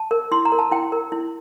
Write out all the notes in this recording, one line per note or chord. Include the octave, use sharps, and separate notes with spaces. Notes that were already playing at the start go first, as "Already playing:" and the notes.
Already playing: A5
A#4
E4 C6
A#5
A#4
A5
E4 G5
A#4
E4